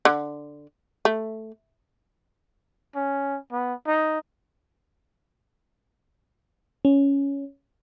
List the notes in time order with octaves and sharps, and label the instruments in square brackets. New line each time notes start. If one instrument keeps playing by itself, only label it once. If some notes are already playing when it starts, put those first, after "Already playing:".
[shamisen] D3
A3
[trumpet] C#4
B3
D#4
[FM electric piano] C#4